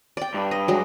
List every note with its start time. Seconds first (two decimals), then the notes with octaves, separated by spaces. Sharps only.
0.17 D5 G5
0.34 G2
0.51 D#5
0.68 F#3 G#3